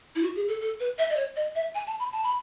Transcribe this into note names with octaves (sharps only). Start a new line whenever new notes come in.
E4
F#4
G#4
A4
A4
B4
E5
D#5
C#5
D#5
E5
G#5
A5
B5
A5
B5